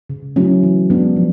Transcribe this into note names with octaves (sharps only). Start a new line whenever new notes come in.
C#3
F#3 A3 C#4 E4
E3
G#3 B3 D4
F3